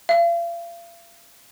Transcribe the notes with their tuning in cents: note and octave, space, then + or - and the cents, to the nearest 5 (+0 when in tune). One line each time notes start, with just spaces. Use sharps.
F5 -40